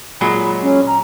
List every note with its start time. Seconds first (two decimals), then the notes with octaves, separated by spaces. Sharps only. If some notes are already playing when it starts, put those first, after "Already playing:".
0.21 A#2 F#3 G#3 B5
0.63 C#4
0.87 A#5